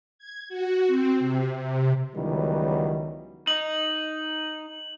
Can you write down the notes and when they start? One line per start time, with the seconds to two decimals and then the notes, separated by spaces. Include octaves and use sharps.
0.18 G#6
0.49 F#4
0.87 C4
1.20 C3
1.56 C3
2.15 C#2 D#3 E3 F#3 G3 B3
3.47 D#4 F#7